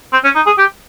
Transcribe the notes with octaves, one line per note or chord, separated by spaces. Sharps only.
C4
C#4
D#4
G#4
G4